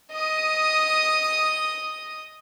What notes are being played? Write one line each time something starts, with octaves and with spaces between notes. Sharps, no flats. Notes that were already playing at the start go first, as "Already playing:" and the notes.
D#5 D#6